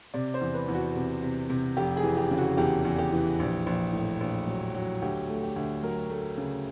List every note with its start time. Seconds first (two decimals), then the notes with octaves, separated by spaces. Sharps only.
0.14 C3 D5
0.34 C5
0.41 E2
0.54 B4
0.68 E2
0.74 F#4
0.96 C3
1.23 C3
1.49 C3
1.77 F1 G4
1.97 G#4
2.03 E3
2.17 G4
2.31 C#3
2.38 F#4
2.57 E2 G4
2.85 E2
2.98 G4
3.13 E3
3.39 A#1
3.66 A#1
3.93 A2
4.21 A#1
4.47 F#3
4.75 F#3
5.02 D2 G4
5.29 A3
5.43 G4
5.56 D2
5.83 F#3 A#4
6.10 A3
6.38 C#3